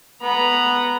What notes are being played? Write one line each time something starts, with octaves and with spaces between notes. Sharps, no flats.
B3 A#5 B5